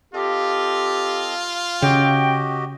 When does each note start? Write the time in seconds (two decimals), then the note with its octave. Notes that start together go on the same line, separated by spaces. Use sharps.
0.14 C4 F4 G4 A4 D#5
1.82 C#3 F#4 G4 D#5 G5